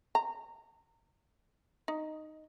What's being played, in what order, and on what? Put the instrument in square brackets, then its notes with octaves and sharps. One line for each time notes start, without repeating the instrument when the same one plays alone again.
[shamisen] A#5
D#4